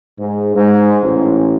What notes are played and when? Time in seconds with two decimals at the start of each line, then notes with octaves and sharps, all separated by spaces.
0.19 G#2
0.56 G#2
1.04 A1